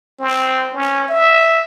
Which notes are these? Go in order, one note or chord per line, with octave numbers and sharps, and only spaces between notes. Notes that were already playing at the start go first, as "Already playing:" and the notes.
C4
C#4
E5